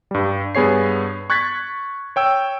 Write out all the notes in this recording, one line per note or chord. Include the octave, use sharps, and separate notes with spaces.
G2 G3
G2 B3 G#4 C#5 C7
C#6 F#6 G#6 A6 B6
C#5 G5 E6